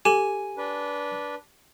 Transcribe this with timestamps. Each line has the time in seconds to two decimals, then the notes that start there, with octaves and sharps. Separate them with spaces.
0.05 G4 A4 G#5
0.57 D4 B4